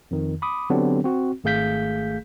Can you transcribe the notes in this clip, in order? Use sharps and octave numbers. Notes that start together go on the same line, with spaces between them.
F2 D#3
B5 D6 D#6
D3 F#3 B3 C4 D4 G4
C4 F#4
G#1 A3 G#4 F5 G6 B6